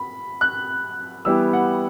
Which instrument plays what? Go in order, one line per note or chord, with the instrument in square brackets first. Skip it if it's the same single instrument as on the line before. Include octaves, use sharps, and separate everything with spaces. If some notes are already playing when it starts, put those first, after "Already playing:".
Already playing: [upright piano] B5
F#6
[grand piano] E3 G3 B3 E4 G4 [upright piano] E6
[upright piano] F#5